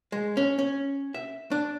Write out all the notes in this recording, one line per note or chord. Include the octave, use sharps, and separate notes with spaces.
G#3
C#4
C#4
E5
D4